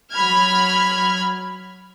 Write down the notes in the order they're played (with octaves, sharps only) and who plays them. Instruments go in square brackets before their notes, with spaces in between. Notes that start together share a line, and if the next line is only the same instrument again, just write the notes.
[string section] F#3 B5 F6 G#6